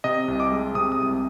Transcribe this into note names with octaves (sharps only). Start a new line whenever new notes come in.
C3 D#5
C2
D6
G#3
C3 D#6
D#6
C2